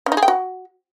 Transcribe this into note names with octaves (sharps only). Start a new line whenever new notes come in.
C#4
D#4
G#4
G5
F#4